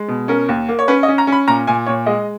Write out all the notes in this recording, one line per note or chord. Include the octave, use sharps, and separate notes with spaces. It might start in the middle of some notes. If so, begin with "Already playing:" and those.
Already playing: G#3
B2
C#4 A#4
D#2
A#3
C#5
C#4 B4
D#5
C#4
A#5
C#4
B5
A#2 A#5
A#2 G#5
A#2 C#5
G#3 D#5